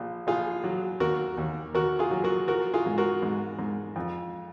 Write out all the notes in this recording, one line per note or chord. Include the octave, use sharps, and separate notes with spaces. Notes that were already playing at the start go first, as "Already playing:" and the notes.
Already playing: A#1 A#2
A#1 F4 G#4
F#3
D#2 F#4 A#4
D#2
D#2 F#4 A#4
F4 G#4
F#3
F#4 A#4
F3 F#4 A#4
F4 G#4
G#2
F#4 A#4
G#2
G#2
F2